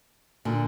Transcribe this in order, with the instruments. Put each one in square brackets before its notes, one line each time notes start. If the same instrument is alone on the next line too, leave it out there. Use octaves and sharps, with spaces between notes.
[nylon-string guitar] A#2 D3